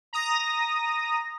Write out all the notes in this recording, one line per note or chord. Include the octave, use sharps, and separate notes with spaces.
A#5 D#6 A#6